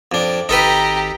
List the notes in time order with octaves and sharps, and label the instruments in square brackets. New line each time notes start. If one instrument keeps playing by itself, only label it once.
[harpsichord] F2 D4
[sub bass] G#1 [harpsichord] D#4 A4 B4 [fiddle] G4 A#5